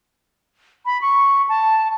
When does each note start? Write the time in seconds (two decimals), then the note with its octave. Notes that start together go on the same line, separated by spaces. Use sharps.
0.86 B5
1.01 C#6
1.49 A5